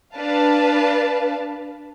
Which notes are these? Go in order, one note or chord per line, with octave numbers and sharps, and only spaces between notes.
D4 B4 F5 A5